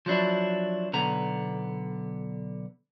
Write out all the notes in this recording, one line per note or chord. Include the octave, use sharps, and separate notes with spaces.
F3 F#3 D4 E4
B1 D3 B3 A#5